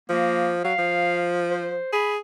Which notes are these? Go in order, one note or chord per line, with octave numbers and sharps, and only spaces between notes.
F3 A#3
F#3 F5
F3
C5
G#4 B5